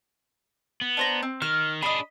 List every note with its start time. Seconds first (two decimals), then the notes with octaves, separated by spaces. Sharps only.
0.81 B3
0.97 D4 C5 A#5
1.23 C4
1.42 D#3 F6
1.82 D4 G#4 D#5 B5